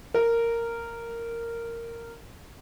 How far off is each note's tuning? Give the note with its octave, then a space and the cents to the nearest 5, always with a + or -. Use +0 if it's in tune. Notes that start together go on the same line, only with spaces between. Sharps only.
A#4 -10